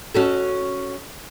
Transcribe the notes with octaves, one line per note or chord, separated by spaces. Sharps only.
C#4 F#4 A4